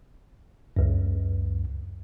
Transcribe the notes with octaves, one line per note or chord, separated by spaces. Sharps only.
C#2 F#2